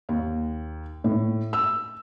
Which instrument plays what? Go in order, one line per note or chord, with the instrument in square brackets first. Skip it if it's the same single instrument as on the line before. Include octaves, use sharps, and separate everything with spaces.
[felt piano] D#2
A2
E6